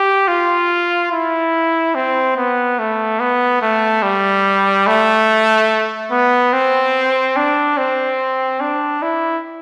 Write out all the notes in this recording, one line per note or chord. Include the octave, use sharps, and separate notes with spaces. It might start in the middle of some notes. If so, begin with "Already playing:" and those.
Already playing: G4
F4
E4
C4
B3
A3
B3
A3
G3
A3
B3
C4
D4
C4
D4
E4